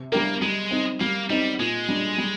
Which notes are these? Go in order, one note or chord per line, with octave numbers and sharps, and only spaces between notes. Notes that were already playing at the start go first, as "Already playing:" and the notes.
Already playing: C3
G3 A#3 D4 G4 A#4
G3 G#3
C4 D#4
G3 A#3
G3 C4 D#4
A#2 G#3
G3 D4
G3